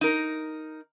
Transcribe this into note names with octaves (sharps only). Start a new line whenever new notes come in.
D#4 A#4